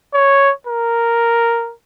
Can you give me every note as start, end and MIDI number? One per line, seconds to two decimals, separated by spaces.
0.14 0.52 73
0.67 1.73 70